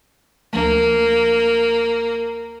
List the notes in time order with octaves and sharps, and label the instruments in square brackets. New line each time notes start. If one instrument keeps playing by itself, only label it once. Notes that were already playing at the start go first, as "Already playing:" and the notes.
[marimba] D2 F3 A3 [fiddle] A#3